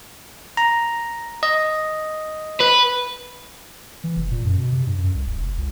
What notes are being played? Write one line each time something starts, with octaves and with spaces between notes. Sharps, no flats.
A#5
D#5
B4
E3
F1
A#2
F#2
B2
C3
G2
F#2
C2
D#1
F1
C#2